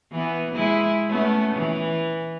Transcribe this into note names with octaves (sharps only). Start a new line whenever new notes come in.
E3 B3
G#3 E4
A3 B3 C#4
E3